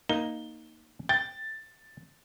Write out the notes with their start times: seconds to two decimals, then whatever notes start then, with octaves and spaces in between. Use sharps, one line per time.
0.09 A#3 D#4 G7
1.09 G5 A6